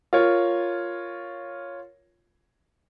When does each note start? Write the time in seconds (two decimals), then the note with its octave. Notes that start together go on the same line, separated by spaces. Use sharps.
0.13 F4 A#4 C#5